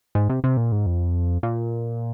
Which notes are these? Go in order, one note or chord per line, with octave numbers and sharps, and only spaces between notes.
G#2
C3
C3
A#2
G#2
F2
A#2